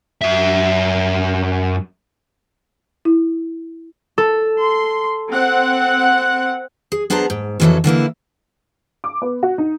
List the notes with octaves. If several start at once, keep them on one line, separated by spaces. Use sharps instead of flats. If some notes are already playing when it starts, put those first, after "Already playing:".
F#2 E5
E4
A4
C6
C4 F#5
G#4
B3 D4 G#4 C5 A5 A#5
G#2
F2 C#3 E3 F#3 C#4 A4
D3 E3 A#3 E4
D6
B3
F#4
D#4